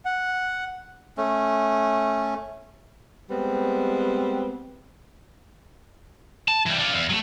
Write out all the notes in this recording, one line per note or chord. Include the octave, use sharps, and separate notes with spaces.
F#5
A3 C#4
G3 G#3 B3 C4
A5
E3 G3
D4 F4
E2
F#3 A3